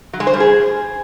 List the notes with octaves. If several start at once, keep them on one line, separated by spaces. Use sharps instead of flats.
F#3
G#3
C5
G3
G#4